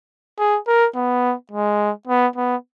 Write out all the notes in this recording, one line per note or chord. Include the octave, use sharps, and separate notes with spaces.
G#4
A#4
B3
G#3
B3
B3